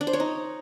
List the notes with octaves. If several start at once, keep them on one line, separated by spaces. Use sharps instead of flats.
D4
C5
C#5
D#4